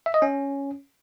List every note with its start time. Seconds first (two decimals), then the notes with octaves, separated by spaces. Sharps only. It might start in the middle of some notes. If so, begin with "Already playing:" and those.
0.06 E5
0.14 D#5
0.22 C#4